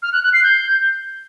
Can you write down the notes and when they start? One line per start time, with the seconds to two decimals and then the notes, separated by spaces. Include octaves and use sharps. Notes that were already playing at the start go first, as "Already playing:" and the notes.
0.02 F6
0.13 F#6
0.23 F#6
0.33 C7
0.43 G6